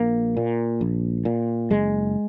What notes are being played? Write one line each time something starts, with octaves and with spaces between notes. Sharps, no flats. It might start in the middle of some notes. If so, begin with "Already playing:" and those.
Already playing: A#1 A#3
A#2
A#1
A#2
F#1 G#3